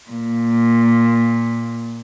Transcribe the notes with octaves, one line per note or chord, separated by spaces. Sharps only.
A#2